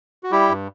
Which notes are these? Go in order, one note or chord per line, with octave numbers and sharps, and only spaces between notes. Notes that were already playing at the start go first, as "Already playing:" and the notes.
F#4
G3 E4 G4
G2